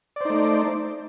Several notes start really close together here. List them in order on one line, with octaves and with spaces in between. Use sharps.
D5 C5 D#4 A3